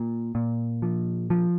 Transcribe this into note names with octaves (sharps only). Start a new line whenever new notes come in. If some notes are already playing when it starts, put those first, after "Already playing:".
Already playing: A#2
A#2
F3
F3